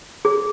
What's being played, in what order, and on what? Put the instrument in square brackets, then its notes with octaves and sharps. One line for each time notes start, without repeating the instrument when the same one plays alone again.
[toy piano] G#4